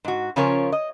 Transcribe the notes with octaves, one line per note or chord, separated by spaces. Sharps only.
G#2 F#4
C#3 F3 C#4 F4 A#4 C#5
D#5